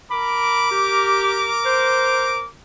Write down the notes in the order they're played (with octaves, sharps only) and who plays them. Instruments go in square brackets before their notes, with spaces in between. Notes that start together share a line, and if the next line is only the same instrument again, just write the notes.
[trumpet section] A#4 D6 [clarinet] B5
[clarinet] G4
C5